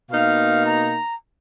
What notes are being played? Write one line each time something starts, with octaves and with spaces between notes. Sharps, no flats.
B2 A#3 D#4 F5
A#5